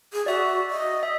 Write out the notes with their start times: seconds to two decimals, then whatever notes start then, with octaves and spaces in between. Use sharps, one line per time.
0.13 G#4
0.26 F#4 D5 E5
0.70 D#5
1.03 E5